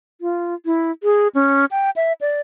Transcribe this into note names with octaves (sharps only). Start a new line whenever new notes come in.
F4
E4
G#4
C#4
G5
E5
D5